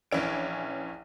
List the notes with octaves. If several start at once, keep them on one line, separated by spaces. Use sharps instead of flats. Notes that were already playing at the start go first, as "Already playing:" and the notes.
A#1 E3 C#4 D7